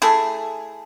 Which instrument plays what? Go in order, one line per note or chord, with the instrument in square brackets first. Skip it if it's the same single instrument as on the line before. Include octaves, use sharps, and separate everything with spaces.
[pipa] A3 E4 G#4